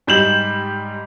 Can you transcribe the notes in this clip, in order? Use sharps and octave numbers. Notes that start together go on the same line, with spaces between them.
G#2 G3 G6 E7 F#7